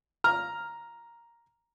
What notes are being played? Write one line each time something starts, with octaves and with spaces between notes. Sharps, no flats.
A#5 F6